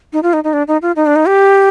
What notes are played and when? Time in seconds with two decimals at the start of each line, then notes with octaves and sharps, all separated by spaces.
0.13 D#4
0.23 F4
0.33 D#4
0.44 D#4
0.53 D4
0.68 D#4
0.82 F4
0.96 D#4
1.06 D4
1.16 D#4
1.26 G4